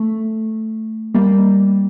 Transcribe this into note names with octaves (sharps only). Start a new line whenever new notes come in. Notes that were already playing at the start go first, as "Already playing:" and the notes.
Already playing: A3
G3 A#3